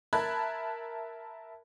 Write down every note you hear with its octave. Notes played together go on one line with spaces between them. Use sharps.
A#4 E5 A5 B5 F#6 G#6